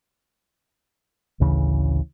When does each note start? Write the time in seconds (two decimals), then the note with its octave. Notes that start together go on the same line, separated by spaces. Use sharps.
1.40 A1 D2 C#3 E3